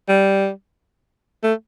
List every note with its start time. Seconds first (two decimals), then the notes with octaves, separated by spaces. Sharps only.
0.09 G3
1.43 A3